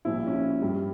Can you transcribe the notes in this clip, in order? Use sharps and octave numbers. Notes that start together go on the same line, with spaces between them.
C2 A#2 F3 E4
C#4
E4
G2 G3